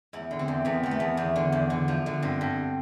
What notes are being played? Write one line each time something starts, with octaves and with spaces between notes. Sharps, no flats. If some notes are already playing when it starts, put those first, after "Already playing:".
E2 E4
D3
C4
E2
E2 B3
E2 A3
B3
E2
E2
D3
E2
D3
F3
D3
G2 C4
G2